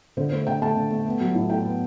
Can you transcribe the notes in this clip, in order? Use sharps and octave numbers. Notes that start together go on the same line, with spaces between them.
D3 C5
A3 C5
D3 G5
A3 A5
D3
A3
B3
F#3
A2
A2 G5
B3